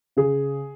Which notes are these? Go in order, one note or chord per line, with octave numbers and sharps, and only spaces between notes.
C#3 G#4